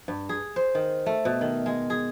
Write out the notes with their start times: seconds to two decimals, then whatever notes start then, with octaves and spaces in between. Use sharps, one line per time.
0.08 G2
0.29 G#4
0.56 C5
0.75 D#3
1.06 A3
1.25 B2
1.41 D#3
1.66 G#3
1.90 G#4